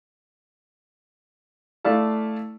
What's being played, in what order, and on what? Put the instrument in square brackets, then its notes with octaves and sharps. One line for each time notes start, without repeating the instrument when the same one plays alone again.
[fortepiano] A3 E4 D5 F5 A5